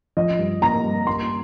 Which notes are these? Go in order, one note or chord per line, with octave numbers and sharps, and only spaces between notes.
F3 D#5
G2
A#3 A#5
G2
A#3 C6